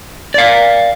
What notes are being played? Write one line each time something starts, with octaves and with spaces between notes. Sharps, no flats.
D5 F5